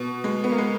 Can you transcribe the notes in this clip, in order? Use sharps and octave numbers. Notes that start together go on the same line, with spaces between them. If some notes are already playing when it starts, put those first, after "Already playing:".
Already playing: B2
G#3
B3
A#3
G#3